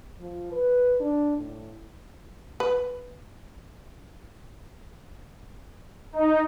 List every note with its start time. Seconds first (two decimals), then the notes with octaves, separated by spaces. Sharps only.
0.20 F3
0.52 B4
1.00 D4
1.37 A2
2.60 B4
6.13 D#4